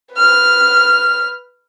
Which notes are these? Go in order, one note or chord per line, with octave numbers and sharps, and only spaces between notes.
B4 F6